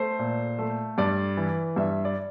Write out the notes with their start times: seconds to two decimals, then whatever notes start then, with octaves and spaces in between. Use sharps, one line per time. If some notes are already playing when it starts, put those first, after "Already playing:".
Already playing: A3 C5
0.19 A#2
0.58 A3
0.98 G2 D5
1.37 E3
1.76 G2 E5
2.05 D5